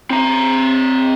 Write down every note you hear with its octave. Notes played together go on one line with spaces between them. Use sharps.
C4 A#5